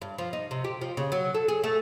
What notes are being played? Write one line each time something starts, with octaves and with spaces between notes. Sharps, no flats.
G2
F3
D#4
C3
G4
F3
C#3
F#3
A4
G#4
A3